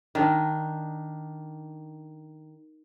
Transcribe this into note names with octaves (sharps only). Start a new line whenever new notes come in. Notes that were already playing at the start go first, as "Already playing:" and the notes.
D#3 D4